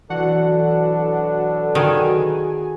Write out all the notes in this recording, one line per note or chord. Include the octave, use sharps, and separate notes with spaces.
B2 E3 F#3 D4 F#4 A4 F#5
D#3 F#4 G#4 G#5